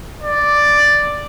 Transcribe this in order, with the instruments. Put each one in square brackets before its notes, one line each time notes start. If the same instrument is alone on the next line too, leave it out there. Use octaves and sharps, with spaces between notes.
[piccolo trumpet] D5